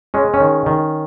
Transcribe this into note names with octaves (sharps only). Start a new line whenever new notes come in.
G#3 C#4
C#4
D#3
D#3